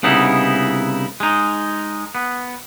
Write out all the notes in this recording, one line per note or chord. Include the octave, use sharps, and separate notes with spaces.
C2 C#3 B3 D#4 E4
G#3 D#4
B3